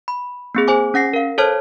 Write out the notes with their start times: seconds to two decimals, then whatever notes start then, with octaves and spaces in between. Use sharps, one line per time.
0.08 B5
0.55 A#3 C4 G#4
0.68 G#4 C5 G#5 D6
0.94 C#4 F#5 A#6 C7
1.14 A#4 F5
1.38 A4 C5 C#5 A5 F6 G#6